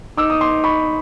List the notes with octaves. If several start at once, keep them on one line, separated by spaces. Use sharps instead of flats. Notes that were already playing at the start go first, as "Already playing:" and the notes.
D#4 D6 E6
D#6
C6 D6
B5 C#6